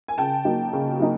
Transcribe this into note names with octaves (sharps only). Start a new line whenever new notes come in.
G#5
C#3 G5 A5
F#3 A#3 D#4
C#3
F#3 A#3 D#4